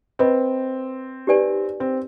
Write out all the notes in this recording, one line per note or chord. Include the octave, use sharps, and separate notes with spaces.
C4 B4 D#5 B5
D#4 G4 B4 D5 G#5
C4